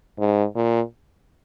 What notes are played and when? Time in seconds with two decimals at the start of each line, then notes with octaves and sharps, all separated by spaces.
0.19 G#2
0.55 A#2